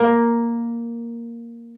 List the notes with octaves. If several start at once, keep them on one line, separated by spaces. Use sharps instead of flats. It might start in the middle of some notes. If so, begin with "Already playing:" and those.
Already playing: A#3